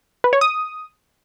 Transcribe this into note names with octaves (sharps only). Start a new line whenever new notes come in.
B4
C#5
D#6